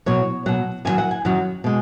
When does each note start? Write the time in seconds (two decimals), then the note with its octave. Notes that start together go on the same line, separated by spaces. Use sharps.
0.06 B2 F#3 C#5
0.46 B2 F#3 F#5
0.85 F#2 D#3 F#3 G#5
0.98 F#5
1.11 G#5
1.25 F#2 D#3 F#3 F#5
1.64 B2 G#3